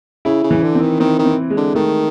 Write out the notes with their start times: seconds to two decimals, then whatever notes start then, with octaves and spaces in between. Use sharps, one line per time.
0.25 C#3 E4
0.43 C#3
0.51 E3
0.63 D3
0.75 C4
0.82 D#3
1.00 D#3 C4
1.19 D#3
1.25 C4
1.50 G#3
1.57 D3
1.75 D#3 A3